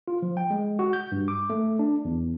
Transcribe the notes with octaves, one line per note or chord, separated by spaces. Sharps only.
F4
F3
G5
G#3
F#4
G6
G2
D6
A3
D4
E2